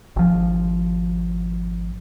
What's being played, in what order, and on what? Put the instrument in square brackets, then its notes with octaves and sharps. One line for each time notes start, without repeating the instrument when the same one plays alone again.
[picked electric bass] G#1 F3